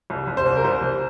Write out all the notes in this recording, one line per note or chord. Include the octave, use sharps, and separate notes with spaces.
C2
C2
C5
C2
A#4
C2 C5
C2